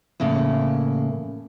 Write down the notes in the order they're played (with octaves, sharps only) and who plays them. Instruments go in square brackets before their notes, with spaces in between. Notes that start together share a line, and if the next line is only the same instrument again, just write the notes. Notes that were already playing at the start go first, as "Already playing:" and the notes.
[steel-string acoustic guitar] E2 A2 C#3 A#3